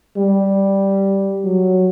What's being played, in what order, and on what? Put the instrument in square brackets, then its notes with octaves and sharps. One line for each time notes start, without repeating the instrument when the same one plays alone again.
[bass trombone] G3
F#3